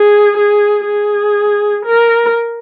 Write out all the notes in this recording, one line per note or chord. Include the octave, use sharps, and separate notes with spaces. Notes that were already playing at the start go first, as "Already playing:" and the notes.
Already playing: G#4
G#4
G#4
A#4